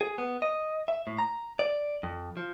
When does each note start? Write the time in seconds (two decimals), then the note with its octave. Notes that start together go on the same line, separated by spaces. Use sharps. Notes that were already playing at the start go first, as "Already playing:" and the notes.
0.01 G#4
0.18 B3
0.42 D#5
0.88 E5
1.07 A2
1.18 A#5
1.59 D5
2.03 F2
2.37 F3